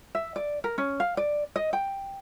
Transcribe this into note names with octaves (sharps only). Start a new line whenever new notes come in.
E5
D5
A#4
C#4
F5
D5
D#5
G5